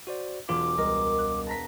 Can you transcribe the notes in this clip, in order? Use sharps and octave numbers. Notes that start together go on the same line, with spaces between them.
F#4 C5 D5
E1 F4 D6
C#2 G3 A#4 D#5
F#6
A5 A#5 B6